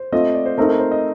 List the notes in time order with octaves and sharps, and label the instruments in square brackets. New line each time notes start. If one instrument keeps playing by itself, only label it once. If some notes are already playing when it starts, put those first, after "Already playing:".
Already playing: [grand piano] C5
[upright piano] A3 C4 F4 [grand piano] D#5
[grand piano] D5
C5
[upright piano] A3 C4 D#4 [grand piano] A#4
[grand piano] A#4
C5
D#5